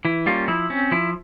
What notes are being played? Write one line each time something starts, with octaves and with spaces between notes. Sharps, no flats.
E3 E4
G3 A#3 C#4 F4
F3 E4
C4 C#4
F3 E4